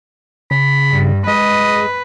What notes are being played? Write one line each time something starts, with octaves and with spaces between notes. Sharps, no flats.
C#3 B5
G2
G#3 B4 D#5